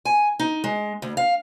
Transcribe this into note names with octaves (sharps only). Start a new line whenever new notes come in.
G#5
D#4
G#3
D2
F5